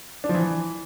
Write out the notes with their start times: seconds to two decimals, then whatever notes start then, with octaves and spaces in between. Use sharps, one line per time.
0.24 D4
0.29 F3
0.35 E3